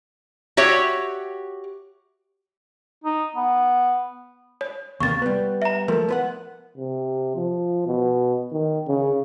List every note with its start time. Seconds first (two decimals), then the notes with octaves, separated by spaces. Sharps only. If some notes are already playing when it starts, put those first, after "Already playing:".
0.57 F#4 G4 C#5 E5
3.04 D#4
3.36 B3
4.61 C#5
5.00 D#2 C3 A#3 C#6 A6
5.22 G3 B3
5.62 E5 A#5
5.88 F3 A3 A#4
6.09 B3 B4 F#5
6.78 C3
7.35 F3
7.87 B2
8.52 D#3
8.88 C#3